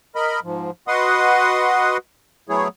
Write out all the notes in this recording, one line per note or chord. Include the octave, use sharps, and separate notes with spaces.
A#4 D#5 B5
G#2 F3
F#4 B4 D#5 F#5 C6 D#6
F#3 A3 B3 E4 G#4 C#5